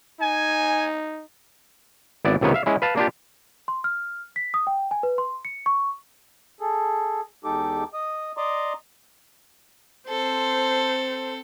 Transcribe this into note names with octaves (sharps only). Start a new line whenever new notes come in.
D#4 G#5
G#1 B3 E4 D5
C#2 C3 D#3 B3 C#5
E5 F5
G#3 C#4 E4
B4 F5 A5
A#3 D4 F4 G4
C6
F6
B6
D#6
G5
G#5
B4
C6
C#7
C#6
G#4 A4
E2 G#3 D#4 G4 A4 D6
D#5 D#6
D5 D#5 A#5 C6 D6 D#6
C4 A4 C5